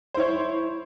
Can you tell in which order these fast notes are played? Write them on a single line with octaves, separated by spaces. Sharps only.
C5 E4 C#5